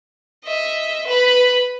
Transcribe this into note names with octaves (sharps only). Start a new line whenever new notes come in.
D#5 E5
B4 B5